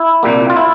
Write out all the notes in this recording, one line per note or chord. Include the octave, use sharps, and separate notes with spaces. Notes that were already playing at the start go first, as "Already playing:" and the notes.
Already playing: E4
C2 A#2 G3 A#3
F4
E4